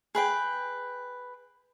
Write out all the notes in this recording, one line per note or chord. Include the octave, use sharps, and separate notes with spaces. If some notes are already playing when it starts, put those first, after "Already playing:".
G#4 B4 G5